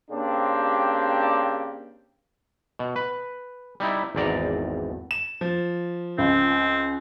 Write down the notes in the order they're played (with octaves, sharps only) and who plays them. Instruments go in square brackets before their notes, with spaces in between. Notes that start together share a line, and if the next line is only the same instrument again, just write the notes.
[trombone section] C#3 A#3 C4 D4 G4
[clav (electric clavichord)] B2
B4
G3 D#4 E4
G#1 E2 D5 A#5
[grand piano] E7
F3
[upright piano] C#2 [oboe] C4